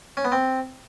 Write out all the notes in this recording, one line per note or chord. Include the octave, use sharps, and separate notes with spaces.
C#4
B3
C4